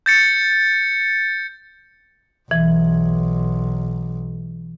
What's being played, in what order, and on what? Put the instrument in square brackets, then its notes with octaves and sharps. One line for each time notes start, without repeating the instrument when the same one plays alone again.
[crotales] G6 A6 C#7
[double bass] B1 [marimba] E3